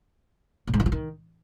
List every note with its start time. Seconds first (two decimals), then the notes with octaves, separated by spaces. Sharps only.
0.67 A2
0.74 G#2
0.80 E3
0.86 F3
0.92 D#3